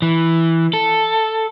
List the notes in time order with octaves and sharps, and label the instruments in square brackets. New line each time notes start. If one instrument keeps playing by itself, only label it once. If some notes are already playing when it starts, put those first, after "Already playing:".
[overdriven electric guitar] E3
A4